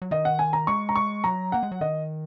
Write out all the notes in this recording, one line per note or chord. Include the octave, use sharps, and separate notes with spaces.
F#3
D#3 D#5
F#5
G#5
A#5
G#3 C#6
A#5
C#6
F#3 A#5
A#3 F#5
G#3
F#3
D#3 D#5